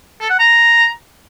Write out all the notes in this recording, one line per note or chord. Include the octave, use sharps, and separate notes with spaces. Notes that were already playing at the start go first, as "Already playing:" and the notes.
A4
F#5
A#5